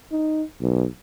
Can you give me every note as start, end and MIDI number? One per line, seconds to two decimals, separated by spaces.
0.12 0.42 63
0.61 0.86 35